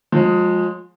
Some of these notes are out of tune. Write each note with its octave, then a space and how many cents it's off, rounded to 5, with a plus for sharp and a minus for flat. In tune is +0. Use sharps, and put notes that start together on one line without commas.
F3 +35 G#3 +0